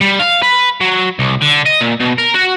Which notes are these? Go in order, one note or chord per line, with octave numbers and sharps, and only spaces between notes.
G3
F5
B4
F#3
C2
D3
D#5
A#2
B2
A#4
F#4